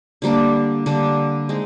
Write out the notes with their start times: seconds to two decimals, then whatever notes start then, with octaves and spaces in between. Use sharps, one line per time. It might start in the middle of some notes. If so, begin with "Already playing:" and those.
0.22 D3 G3 A#3 D4
0.86 D3 G3 A#3 D4
1.49 G#3 C4 D#4